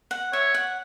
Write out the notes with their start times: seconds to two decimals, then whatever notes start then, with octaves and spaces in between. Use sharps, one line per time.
0.11 F#5
0.33 C#5 E5
0.54 F#5